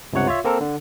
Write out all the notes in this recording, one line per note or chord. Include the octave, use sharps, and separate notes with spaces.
C#2 G2 C3 C#5 F#5
F4 C#5 E5
A#3 C4 A4 A#4
D3